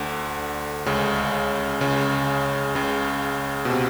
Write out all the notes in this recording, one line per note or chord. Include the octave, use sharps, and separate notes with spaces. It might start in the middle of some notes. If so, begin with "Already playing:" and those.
Already playing: D2 D3
C#2 C#3
C#2 C#3
C#2 C#3
B2
C3